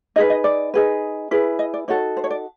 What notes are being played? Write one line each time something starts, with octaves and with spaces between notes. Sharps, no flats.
D#4 G#4 B4 D#5
D#5
D5
D#4 G#4 B4
E4 G#4 B4
D#5
D5
D#4 F#4 A4 C#5
C5
C#5
D5